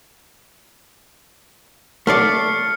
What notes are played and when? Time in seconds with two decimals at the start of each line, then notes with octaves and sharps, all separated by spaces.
2.07 A3 A4 D5 F6 C7 C#7